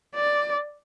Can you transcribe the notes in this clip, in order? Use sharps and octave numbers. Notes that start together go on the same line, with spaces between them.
D5